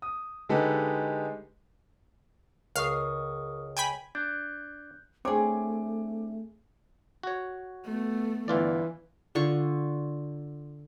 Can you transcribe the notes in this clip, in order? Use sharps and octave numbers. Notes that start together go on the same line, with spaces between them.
D#6
D3 G#3 D#4 G4 A4 B4
C#2 A#4 F5 C#6 D#6
G5 G#5 B5
D4 F#6 G6
A3 C4 D4 G#4 C#5 D6
F#4 C#5
A3 B3
G1 E3 F4 D5
D3 F4 C#6